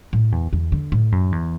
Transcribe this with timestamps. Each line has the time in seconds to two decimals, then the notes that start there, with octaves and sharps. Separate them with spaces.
0.13 A2
0.32 E2
0.53 E2
0.72 D3
0.92 A2
1.12 F#2
1.32 E2